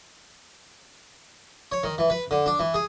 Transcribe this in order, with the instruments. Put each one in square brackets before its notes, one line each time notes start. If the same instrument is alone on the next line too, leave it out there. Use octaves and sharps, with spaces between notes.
[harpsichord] C#5
D#3
E3
B4
D3
D4
E3
G#4